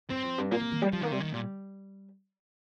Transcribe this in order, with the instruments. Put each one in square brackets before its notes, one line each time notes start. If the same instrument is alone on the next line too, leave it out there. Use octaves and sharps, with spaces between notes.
[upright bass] G2 [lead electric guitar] C4
[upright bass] F2
G2
[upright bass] A#2 [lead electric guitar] A#3
[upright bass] C3
D#3
G3
[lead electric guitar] F3 [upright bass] G3
[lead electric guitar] D#3 [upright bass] A#3
[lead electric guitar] C3 [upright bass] G3
[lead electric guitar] D#3 [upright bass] A#3
[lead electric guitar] A#2 [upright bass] G3